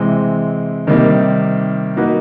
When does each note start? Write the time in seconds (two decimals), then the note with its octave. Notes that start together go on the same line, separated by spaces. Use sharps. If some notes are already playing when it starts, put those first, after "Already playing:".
Already playing: C3 E3 G#3 C4
0.87 C3 D#3 G3 A#3 D#4
1.96 F#3 A#3 D#4 F#4 B4